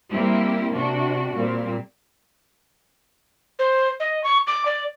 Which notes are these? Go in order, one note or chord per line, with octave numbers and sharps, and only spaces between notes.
G3 A#3 C4 E4 G4
C3 D4 F#4
A#2 G3 A#3 C4
C5
D#5
C#6
D6
D5